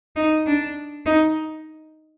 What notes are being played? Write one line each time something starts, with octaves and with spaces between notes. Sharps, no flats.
D#4
D4
D#4